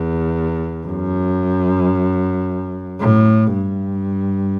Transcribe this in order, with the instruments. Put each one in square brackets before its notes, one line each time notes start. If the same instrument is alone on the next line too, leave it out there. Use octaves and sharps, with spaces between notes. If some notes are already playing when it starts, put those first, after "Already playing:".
Already playing: [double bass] E2
F#2
A2
G2